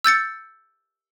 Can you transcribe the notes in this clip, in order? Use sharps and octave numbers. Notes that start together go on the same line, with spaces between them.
E6 G6 A6 C#7